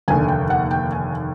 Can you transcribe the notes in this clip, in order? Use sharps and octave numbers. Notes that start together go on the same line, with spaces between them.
F1 D#2 D3 G#5
G5
F#5
G5
G#5